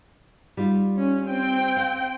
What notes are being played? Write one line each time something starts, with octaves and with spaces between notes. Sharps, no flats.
G3 D#4 F4
C#4
C4 G5
F5